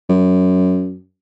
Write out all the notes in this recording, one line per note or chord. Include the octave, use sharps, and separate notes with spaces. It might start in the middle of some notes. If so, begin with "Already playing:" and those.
F#2